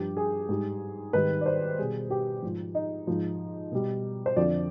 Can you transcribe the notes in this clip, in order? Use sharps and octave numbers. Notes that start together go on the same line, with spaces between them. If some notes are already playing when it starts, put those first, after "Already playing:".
Already playing: G2 F3 G4
G#4
G#2 G3
G#2 D#3 G3 B4
D5
C5
B2 G3 G#4
G4
G#2 F3 F4
D#4
G#2 F3
B2 G3
C5
F2 D3 F3 D5